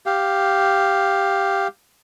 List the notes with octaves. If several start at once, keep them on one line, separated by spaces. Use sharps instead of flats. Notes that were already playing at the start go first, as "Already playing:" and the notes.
G4 F5